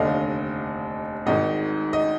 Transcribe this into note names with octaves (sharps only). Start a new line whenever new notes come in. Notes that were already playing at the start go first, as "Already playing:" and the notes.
Already playing: F1 D#2 D3 D#5 F5
G#1 G#2 D#3 D#5
D#5